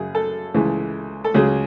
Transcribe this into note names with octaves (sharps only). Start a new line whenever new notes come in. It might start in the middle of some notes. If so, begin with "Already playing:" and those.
Already playing: F#2 C#3 F#3 G#4
A4
C#2 C#3 E3
A4
C#2 C#3 F#3 G#4